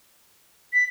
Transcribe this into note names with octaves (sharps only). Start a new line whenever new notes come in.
B6